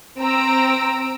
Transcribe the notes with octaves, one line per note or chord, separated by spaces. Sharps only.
C4 A#5 E6 D7